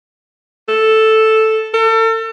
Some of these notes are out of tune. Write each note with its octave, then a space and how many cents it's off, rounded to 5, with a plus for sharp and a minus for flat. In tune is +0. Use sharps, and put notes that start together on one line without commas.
A4 +0
A4 +35